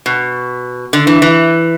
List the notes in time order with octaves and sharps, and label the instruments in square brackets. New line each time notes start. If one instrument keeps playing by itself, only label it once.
[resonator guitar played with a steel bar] B2
D3
E3
E3